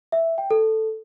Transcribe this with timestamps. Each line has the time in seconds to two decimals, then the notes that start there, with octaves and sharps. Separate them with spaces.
0.12 E5
0.38 G5
0.51 A4